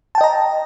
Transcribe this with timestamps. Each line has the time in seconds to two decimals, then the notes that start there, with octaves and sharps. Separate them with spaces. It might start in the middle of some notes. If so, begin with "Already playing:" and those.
0.15 A5
0.18 G5
0.21 D#5
0.24 A#5